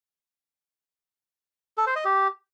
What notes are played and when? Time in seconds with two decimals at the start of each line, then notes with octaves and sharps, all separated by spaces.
1.78 A4
1.87 C5
1.96 D#5
2.05 G4